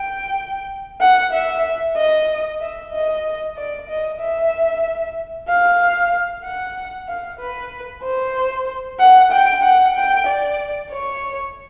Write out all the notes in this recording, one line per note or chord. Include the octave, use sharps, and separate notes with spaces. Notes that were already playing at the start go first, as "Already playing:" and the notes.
Already playing: G5
F#5
E5
D#5
E5
D#5
D5
D#5
E5
F5
F#5
F5
B4
C5
F#5
G5
F#5
G5
D5
C#5